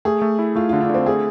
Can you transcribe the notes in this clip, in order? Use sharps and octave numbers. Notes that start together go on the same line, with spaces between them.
A3 G#4
A3
E4
A3 F4
D3 F4
D4
D3 C4
A3 G#4